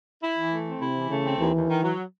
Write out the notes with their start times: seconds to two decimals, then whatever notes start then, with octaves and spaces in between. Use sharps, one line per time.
0.22 E4
0.36 E3
0.51 A3
0.66 C4
0.80 C3 E4
0.96 E3
1.10 C#3 A3
1.24 C4
1.39 D#2 E3
1.54 D#2
1.68 D#3
1.83 F#3